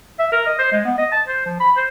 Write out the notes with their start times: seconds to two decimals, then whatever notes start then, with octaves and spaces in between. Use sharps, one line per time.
0.19 E5
0.32 A#4
0.46 D#5
0.59 C5
0.72 G#3
0.85 B3
0.98 D#5
1.12 A5
1.27 C5
1.46 F3
1.60 B5
1.77 C5